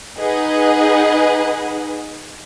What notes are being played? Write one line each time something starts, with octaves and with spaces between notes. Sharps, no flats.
D#4 G#4 B4 D#5 F#5